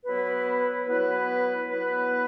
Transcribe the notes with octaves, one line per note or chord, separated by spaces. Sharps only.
F#3 B3 E4 B4
F#3 B3 E4 B4
F#3 B3 E4 B4